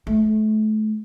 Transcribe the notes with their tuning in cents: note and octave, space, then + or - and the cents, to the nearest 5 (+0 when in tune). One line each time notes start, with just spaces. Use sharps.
A3 -30